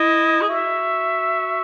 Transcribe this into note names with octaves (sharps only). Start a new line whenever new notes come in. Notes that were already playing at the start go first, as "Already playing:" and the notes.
Already playing: E4 D#5
G#4
F#4 E5